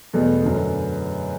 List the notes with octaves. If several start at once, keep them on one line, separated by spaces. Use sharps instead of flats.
E2 B2 A3 B3
F#2 D3